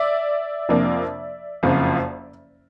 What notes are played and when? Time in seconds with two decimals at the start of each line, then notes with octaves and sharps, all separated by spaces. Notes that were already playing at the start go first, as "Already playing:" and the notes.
Already playing: D5 E5
0.69 F2 C3 F3 A#3 D4
1.63 F#1 F2 C#3 F3